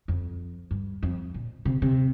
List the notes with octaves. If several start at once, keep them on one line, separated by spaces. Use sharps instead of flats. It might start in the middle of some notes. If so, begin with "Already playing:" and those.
F2
G2
F2
A#2
C3
C3